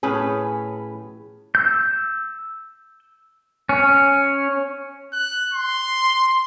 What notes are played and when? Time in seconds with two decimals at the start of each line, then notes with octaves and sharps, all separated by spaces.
0.03 A2 C#4 G#4 B4
1.55 E6 G6
3.69 C#4
5.13 F#6
5.53 C6